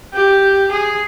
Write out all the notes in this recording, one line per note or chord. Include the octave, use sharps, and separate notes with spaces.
G4
G#4